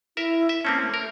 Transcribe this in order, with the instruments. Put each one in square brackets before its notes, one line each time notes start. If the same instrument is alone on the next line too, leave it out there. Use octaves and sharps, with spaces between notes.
[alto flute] E4 [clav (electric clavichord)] A#4 E5
[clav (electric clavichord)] E5
[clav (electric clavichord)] A#3 C4 C#4 [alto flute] A5
[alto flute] A3
[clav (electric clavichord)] A#4